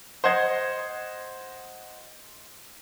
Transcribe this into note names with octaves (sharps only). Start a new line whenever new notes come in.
C5 D#5 F#5 G#6